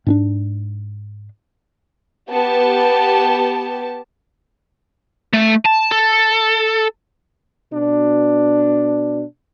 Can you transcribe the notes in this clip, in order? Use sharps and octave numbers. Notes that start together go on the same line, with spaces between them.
G#2 C#4 D4
B3 G4 A5
A3
A5
A4
B2 D4